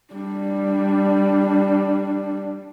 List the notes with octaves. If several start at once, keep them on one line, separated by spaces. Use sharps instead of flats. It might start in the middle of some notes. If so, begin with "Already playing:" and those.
G3 D4